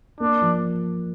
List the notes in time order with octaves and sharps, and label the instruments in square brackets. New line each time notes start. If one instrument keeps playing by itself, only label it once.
[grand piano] A#3 [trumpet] D4
[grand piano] F3